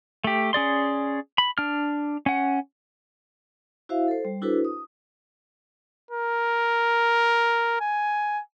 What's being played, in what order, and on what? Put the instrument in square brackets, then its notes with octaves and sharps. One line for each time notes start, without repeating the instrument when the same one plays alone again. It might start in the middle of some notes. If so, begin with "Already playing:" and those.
[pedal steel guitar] A3 G4
C#4 G#4 D5 C6
B5
D4 F6
C#4 F#5
[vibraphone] E4 F#4 C5 E5 F5
A4 C5
G3
D4 E4 F#4 A4 B4 C5
D#6
[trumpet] A#4
G#5